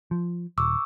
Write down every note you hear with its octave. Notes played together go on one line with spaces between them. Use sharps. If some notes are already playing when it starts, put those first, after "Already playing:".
F3
D#1 C#6 D6 E6